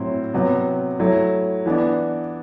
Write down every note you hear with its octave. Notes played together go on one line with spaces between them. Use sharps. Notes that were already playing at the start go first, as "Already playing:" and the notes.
Already playing: A2 F#3 C4 E4
C3 F#3 B3
F#3 A3 E4
E3 B3 D4